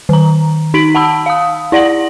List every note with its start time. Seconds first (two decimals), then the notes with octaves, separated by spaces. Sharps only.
0.09 D#3 A#5
0.74 D#4 B6 D7 F#7
0.95 F#5 A5 B5 E6
1.26 F5 D#6
1.72 E4 D5 F#5 A#6 F#7